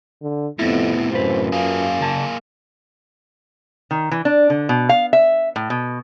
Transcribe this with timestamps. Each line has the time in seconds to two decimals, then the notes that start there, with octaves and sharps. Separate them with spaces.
0.22 D3
0.59 F2 A2 C3 B3 E4
1.13 F#2 F4 B4 C5
1.52 A#3 G#4 F5
2.01 C#3 A5
3.91 D#3
4.11 E3
4.25 D4
4.50 D3
4.69 B2
4.89 F5
5.13 E5
5.56 A2
5.70 B2